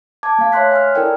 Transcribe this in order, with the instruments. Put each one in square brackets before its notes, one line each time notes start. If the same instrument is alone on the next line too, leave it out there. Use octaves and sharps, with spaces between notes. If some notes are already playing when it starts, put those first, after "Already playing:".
[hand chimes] A5 D6 G#6
A3 F5
C#5 E5 C6 F#6 B6
G#5 F6
E4 A4 A#4 D5 G5